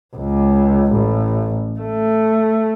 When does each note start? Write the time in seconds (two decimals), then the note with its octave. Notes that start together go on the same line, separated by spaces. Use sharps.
0.16 C#2
0.93 A1
1.80 A3